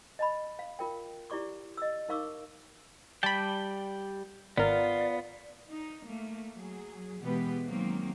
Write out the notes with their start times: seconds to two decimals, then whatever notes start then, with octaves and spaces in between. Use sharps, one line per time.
0.19 D#5 A5 B5
0.59 F5
0.79 F4 A#4 G5
1.30 E4 G4 D5 C#6 D6
1.77 D#5 E6
2.09 D#4 A#4 F5 C#6 D6 E6
3.23 G3 D5 G5 A5 B5
4.58 G#1 B3 F4 A#4 D5
5.67 D#4
6.05 A3 A#3
6.53 F#3 G#4
7.21 B2 E3 G#3 B3 G4 B4
7.66 D#3 F#3 G#3 A#3 C4